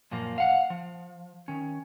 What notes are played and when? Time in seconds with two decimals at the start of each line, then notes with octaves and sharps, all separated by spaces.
0.11 F#2 A#2 F3 A#3
0.38 F5 F#5
0.70 F3
1.48 D#3 C#4